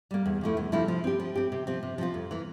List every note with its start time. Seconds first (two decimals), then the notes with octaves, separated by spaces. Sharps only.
0.11 G3 A#3
0.26 E2
0.41 C3 F3 A3 E4
0.57 E2
0.72 C3 F3 A3 E4
0.88 F3
1.04 C4 G4
1.20 F3
1.36 C4 G4
1.52 C3
1.67 F3 C4 F4
1.83 C3
1.98 F3 C4 F4
2.14 F2
2.31 E3 A#3